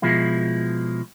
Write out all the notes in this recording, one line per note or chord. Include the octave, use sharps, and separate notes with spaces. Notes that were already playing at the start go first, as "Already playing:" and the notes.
B2 F3 G#3 E4